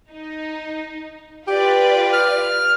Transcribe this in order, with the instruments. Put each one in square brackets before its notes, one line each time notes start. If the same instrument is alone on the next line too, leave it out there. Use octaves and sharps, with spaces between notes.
[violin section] D#4
[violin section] F4 B4 D5 [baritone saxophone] G4
[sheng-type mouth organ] F6